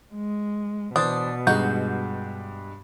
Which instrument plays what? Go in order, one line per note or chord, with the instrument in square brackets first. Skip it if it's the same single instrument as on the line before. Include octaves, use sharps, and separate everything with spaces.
[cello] G#3
[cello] B2 [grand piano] E3 C5 A6 [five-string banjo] D4 [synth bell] D#6
[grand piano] G2 G#3 [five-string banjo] D#4 F#4 [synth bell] G6